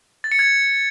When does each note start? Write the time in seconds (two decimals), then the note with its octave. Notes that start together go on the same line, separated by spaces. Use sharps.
0.24 A6
0.32 C#7
0.39 G#6